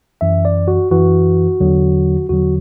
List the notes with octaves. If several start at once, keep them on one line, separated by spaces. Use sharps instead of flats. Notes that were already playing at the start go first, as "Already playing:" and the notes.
F#2 E3 E5
D5
F#4
F#2 E3 F#4
E2 D3 F#3
E2 D3 F#3 F#4